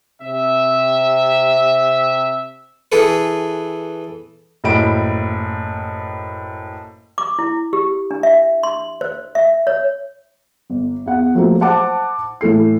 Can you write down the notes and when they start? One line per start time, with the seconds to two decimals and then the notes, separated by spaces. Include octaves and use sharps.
0.21 C3 E5
2.92 E3 G#4 A4 B4
4.64 F#1 A2 B5 D7
7.18 D6
7.39 E4
7.73 G4
8.11 D4
8.23 E5
8.63 C6
9.01 C5
9.35 E5
9.67 C#5
10.70 G1
11.06 E2 F#5
11.35 F3 F#3 A3 A#3
11.61 C5 F#5 A5 D6
12.41 A2 E3 A4 C7